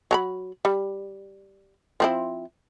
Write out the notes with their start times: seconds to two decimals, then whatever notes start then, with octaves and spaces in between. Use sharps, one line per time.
0.11 F#3 A#5 B5
0.65 G3
2.00 F3 C4 E4